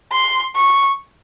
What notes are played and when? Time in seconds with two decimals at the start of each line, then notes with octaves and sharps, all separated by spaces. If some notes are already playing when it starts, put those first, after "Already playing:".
0.12 C6
0.56 C#6